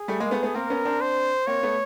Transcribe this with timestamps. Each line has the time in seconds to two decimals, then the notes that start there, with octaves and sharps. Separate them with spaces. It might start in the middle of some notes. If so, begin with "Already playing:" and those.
Already playing: G#4
0.08 G3 A3
0.20 G#3 A#3
0.31 A3 B3
0.43 A3 B3
0.54 A#3 C4 A#4
0.70 B3 C#4
0.85 C4 D4
1.01 C5
1.47 A#3 C4 C#5
1.63 A3 B3